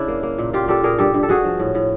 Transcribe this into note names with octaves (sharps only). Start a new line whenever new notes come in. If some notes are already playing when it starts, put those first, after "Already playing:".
Already playing: C#3 D4 E4
A#3
A#3
A#2
A#2 F4 G4
A#2 G4 A4
A#2 G#4 A#4
G2 G4 A4
G2
A4
G2 F#4 G#4
F3
A2
A2